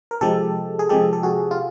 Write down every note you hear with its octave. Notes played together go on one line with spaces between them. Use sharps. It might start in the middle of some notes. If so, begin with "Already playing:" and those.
A#4
C3 F3 G#3 G4 A4
G#4
C3 F3 G#3 G4 A4
A4
F#4 G#4
F4